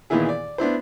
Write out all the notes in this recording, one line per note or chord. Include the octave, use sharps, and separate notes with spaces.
A#2 D#3 E3 B3 E4 G#4
D5
B3 D4 E4 C5